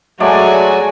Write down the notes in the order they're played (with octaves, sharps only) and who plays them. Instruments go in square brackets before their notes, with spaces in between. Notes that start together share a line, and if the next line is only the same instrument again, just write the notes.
[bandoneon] F#3 [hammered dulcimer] G#3 A3 D5 [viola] F#4 G#5